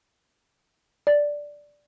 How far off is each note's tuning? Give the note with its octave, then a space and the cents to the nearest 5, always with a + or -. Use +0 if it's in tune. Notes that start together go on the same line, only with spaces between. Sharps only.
D5 +0